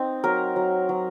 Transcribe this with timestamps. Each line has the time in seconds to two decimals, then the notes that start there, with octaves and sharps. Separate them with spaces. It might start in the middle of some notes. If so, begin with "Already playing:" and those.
Already playing: C4 D#4
0.24 F#3 A#4
0.56 F#3
0.89 F#3